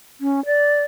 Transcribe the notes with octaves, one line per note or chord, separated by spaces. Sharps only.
C#4
D5